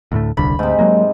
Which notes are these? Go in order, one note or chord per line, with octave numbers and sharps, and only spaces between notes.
D2 A2 A3
D#1 C2 D3 B5
D2 G#2 C3
F#3 G#3 A#3